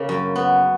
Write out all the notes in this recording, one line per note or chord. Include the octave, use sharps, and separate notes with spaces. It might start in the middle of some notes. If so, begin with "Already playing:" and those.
Already playing: C#3 A#3
F#2
B3